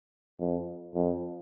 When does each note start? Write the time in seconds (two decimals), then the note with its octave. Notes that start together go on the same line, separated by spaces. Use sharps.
0.39 F2
0.94 F2